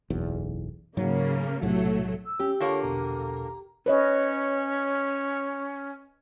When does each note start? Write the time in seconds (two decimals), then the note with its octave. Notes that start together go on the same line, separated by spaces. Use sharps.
0.10 F#1 B1 E2
0.97 G#2 C#3 F#3 A#3
1.62 B1 A2 C3 F#3 A3
2.26 E6
2.40 C#4 G4
2.60 D3 A#3 F4 C#5 C#6
2.82 A#1 E2 B2 A#5
3.86 C#4 B4 C#5 D#5